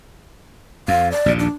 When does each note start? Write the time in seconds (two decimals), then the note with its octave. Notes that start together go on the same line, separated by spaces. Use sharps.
0.88 F2 F5
1.12 D5
1.26 A#1 D#2 A#2
1.39 D4